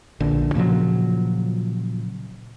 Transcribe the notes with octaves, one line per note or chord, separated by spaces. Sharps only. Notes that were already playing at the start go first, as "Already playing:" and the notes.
A#1 D3
A#2 C#3 F3 F#3